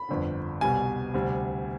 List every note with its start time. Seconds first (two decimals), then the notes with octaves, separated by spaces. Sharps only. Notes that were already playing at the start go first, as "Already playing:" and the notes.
Already playing: B5
0.09 G1 F2 D3
0.61 C2 B2 G3 G#5
1.14 D2 C3 G3